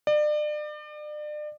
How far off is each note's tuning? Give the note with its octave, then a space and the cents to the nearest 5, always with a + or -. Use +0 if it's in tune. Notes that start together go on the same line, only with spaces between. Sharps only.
D5 +35